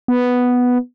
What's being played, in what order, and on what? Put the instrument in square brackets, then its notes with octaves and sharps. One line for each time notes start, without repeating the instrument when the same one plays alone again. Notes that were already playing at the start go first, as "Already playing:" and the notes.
[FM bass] B3